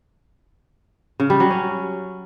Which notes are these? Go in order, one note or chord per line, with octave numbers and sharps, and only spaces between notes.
C#3
G3
F#3
C#4